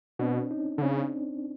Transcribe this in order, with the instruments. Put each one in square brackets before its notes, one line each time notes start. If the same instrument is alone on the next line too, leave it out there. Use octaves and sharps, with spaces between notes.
[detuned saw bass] B2 [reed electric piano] C4 D4
[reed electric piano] C#4 D#4
[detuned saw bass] D3
[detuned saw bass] C#3 [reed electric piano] C4 D4